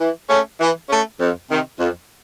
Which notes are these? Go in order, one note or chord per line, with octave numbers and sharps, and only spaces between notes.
E3
A3 C#4
E3
A3 C#4
F2
C3 D#3
F2